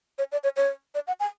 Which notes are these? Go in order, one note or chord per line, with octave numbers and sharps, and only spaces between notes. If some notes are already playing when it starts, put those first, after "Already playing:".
C#5
D5
C#5
C#5
D5
F#5
G#5